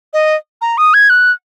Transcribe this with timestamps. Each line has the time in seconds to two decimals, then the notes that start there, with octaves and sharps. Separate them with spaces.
0.13 D#5
0.62 A#5
0.78 D#6
0.94 G#6
1.10 F#6